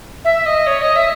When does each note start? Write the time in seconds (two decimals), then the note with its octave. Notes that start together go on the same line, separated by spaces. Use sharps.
0.25 E5
0.46 D#5
0.67 C#5
0.82 D#5
0.96 E5